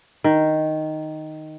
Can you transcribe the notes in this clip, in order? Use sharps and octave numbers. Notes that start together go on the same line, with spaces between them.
D#3